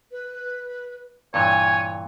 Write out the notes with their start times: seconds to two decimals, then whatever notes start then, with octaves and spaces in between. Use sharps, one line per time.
0.11 B4
1.34 G2 A#2 E3 C#5 G#5